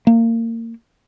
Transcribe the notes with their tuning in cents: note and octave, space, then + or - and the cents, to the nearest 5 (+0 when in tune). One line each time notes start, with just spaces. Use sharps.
A#3 -30